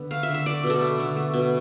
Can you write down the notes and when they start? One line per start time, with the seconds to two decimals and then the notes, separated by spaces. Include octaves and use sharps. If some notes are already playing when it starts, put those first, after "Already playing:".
Already playing: D3 B3
0.11 A3 F5
0.23 E5
0.29 D3
0.34 E5
0.46 A3 D5
0.63 B2
0.70 A4
0.81 A3
0.99 D3
1.16 A3
1.34 B2